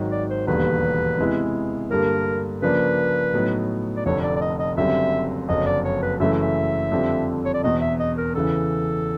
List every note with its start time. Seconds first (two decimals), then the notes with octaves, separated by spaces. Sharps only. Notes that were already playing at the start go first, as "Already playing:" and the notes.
Already playing: G#1 G#2 D#3 F#3
0.11 D5
0.30 C5
0.47 E1 D#2 D3 G3 B3 B4
1.19 C3 E3 G#3 B3 E4
1.91 G2 D3 G3 A#3 A#4
2.62 C#3 F3 A#3 D4 B4
3.33 A2 F#3 B3 D#4
3.97 D5
4.05 F1 F2 D3 C#5
4.23 D5
4.36 D5
4.41 D#5
4.59 D#5
4.77 F#1 F#2 D3 G3 C4 E5
5.49 F#1 F2 D3 F#3 D#5
5.66 D5
5.85 C#5
6.02 B4
6.20 F#2 C#3 E3 A3 E5
6.42 E5
6.92 F2 D3 G3 C4 F4
7.45 C#5
7.54 D5
7.63 E1 E2 B2 D#5
7.81 E5
7.99 D#5
8.17 A#4
8.35 E2 C#3 E3 A4